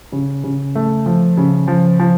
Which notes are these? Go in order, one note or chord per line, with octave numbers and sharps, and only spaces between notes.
C#3
C#3
A3
F3
C#3
F3
F3